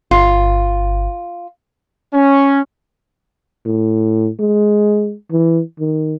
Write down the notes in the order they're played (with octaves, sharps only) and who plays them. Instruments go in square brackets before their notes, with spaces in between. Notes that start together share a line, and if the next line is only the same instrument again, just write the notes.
[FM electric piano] G1 [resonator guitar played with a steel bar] F4
[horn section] C#4
[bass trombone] A2
G#3
E3
D#3